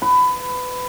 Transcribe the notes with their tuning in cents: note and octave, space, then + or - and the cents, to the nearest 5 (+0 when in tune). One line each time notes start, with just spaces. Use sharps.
B4 +20